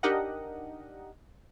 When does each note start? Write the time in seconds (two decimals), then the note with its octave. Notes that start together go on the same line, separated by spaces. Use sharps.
0.03 D4 D#4 G4 A#4 D#5 F#5